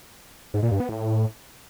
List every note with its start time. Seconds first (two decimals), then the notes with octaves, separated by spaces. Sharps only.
0.54 G#2
0.63 A#2
0.71 G2
0.80 B3
0.89 A2